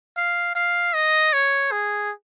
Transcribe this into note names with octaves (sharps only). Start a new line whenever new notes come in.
F5
F5
D#5
C#5
G#4